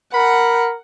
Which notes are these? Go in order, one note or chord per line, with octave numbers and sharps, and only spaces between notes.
A#4 F#5 B5